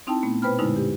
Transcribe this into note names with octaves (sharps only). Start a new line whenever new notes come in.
C4 D#4 E4 G5 A5
A#2 A3 B3
B2 B4 C5 G5 B5 F6
F#2 A#2 D3 G#3 D#4 E4
G4